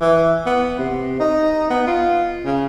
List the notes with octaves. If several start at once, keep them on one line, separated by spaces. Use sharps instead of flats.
E3
B3
C3
D#4
B3
F4
C#3